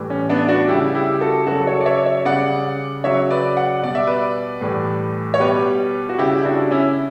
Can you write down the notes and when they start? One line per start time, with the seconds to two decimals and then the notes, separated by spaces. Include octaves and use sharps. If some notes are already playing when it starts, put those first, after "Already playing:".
Already playing: A2 E3 G3
0.10 C#4
0.29 B3 D4
0.48 D4 F#4
0.68 C#3 G3 E4 G4
0.94 E4 G4
1.21 F#4 A4
1.47 C#3 F#3 F#4 A4
1.67 A4 C#5
1.81 D5
1.86 C#5 E5
2.05 C#5 E5
2.25 C#3 G3 D5 F#5
3.04 C#3 F#3 C#5 E5
3.30 B4 D5
3.57 D5 F#5
3.83 B2 G3 D5
3.95 E5
4.07 B4 D5
4.61 A2 E3 G3
5.34 C#5
5.40 B2 G3 G4 B4
6.09 F#4
6.18 C#3 G3 E4 G4
6.41 E4
6.45 D4 F#4
6.71 C#4 E4